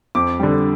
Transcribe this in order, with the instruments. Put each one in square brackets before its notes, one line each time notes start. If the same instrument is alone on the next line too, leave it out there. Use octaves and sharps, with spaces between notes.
[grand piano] F2 D6
D3 G3